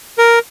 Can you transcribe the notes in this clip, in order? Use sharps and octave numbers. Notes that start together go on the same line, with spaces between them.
A#4